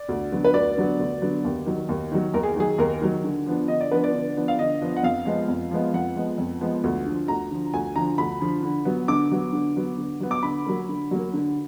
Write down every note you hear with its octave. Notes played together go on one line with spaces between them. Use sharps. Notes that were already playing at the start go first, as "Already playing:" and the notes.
Already playing: D5
D2
D3 F#3 B3
B4
D2 D5
D3 F#3 B3
D2
D3 F#3 B3
D#2
D#3 F#3
D#2
D#3 F#3
D#2 A#4
G#4
D#3 F#3 G#4
D#2 A#4
D#3 F#3
D3
F3 B3 D4
D3 D#5
D5
F3 B3 D4 B4
D5
D3
F3 B3 D4
F5
D3 D#5
F3 B3 D4
F#5
F2 F5
F3 G#3 B3
F2
F3 G#3 B3
F2 F#5
F3 G#3 B3
F2
F3 G#3 B3
D2
D3 F3
D2 A#5
D3 F3
D2 G#5
D3 F3 A#5
D2 B5
D3 F3
D3
F#3 B3
D3 D6
F#3 B3
D3
F#3 B3
D3
F#3 B3
D6
D3 B5
F#3 A#3
D3
F#3 A#3
D3